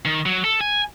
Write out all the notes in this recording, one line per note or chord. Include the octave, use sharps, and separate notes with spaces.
D#3
F#3
A4
G#5